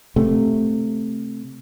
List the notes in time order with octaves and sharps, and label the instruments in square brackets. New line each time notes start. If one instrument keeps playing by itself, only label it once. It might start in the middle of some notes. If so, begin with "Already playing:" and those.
[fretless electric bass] C3 A3